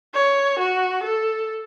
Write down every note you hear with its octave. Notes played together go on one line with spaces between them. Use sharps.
C#5
F#4
A4